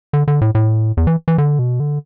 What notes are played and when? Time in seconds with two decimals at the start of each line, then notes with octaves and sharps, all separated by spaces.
0.13 D3
0.28 D3
0.41 A2
0.55 A2
0.97 E2
1.07 E3
1.28 E3
1.38 D3
1.59 B2
1.80 D3